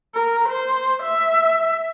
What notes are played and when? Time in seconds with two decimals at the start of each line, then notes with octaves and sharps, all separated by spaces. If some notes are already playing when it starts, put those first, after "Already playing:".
0.14 A#4
0.49 C5
1.03 E5